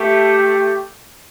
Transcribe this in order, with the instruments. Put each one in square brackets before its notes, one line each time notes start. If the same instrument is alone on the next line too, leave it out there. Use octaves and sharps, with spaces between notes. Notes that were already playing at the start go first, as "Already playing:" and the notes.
Already playing: [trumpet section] A3 G4